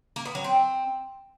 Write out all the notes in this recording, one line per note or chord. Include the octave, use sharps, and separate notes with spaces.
A#3
B3
F#3
C4